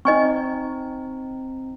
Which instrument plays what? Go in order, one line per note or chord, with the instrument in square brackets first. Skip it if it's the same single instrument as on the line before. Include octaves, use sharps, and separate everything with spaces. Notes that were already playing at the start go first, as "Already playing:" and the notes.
[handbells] C4 D#4 [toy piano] D#5 G#5 C#6